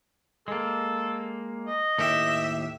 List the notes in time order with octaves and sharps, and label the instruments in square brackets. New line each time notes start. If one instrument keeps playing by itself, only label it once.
[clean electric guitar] G#3 A#3 [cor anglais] A4
[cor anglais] D#5
[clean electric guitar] D#2 A2 G4 [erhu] E5